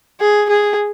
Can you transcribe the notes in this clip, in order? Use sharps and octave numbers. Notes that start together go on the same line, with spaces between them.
G#4
G#4